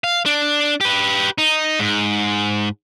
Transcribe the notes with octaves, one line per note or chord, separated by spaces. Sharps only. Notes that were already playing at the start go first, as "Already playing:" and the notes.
F5
D4
G4 B4
D#4
G#2